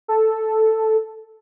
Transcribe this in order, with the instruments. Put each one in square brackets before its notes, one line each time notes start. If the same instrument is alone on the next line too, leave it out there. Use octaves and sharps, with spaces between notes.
[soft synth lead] A4